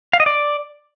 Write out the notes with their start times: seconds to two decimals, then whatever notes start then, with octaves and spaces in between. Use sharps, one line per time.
0.13 F5
0.20 D#5
0.26 D5